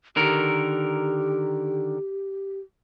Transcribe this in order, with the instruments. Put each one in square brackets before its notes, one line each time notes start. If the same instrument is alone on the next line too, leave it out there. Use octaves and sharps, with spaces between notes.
[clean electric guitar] D3 D#3 A#4 [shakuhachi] G4